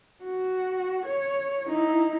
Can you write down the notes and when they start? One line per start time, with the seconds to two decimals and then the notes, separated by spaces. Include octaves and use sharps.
0.24 F#4
1.06 C#5
1.67 D#4 E4